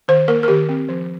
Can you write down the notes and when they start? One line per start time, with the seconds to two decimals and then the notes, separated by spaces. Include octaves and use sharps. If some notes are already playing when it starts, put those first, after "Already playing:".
0.08 D#3 C5
0.28 A#3 A#4
0.43 A#4
0.48 D#3 G4
0.69 C4
0.89 F3